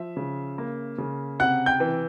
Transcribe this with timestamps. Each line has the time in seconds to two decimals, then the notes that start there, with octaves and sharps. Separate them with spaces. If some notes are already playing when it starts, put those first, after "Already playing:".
Already playing: F3 E5
0.17 C#3
0.58 A#3
0.98 C#3
1.40 C3 F#5 F#6
1.66 G5 G6
1.80 E3